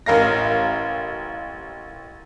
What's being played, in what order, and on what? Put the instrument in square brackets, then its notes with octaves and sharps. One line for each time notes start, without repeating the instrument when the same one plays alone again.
[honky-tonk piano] A1 A#4 F5 A#6